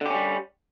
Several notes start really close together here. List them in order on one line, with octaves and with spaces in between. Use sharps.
D3 G4 C#4 G3